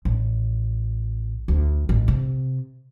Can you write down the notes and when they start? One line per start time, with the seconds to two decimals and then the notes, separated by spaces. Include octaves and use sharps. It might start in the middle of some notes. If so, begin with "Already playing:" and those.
0.05 A1
1.48 D2
1.89 A1
2.08 C3